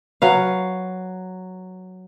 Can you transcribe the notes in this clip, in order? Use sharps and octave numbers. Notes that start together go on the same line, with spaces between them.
F#3 B4 F5